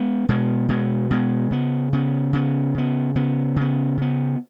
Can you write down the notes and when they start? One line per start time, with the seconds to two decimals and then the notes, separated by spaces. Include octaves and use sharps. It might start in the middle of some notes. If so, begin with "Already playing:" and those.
Already playing: G#3 B3
0.29 B2 G#3 B3
0.69 B2 G#3 B3
1.10 B2 G#3 B3
1.51 C#3 B3
1.93 C#3 B3
2.33 C#3 B3
2.75 C#3 B3
3.15 C#3 B3
3.56 C#3 B3
3.97 C#3 B3